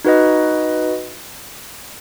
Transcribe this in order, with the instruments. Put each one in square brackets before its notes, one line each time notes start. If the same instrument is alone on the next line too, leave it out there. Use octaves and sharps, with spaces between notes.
[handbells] D#4 F#4 B4 D#5